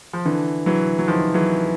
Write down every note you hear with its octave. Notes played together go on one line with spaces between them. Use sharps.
F3
D3 E3
E3 F#3
F#3
D#3 F3
E3 F#3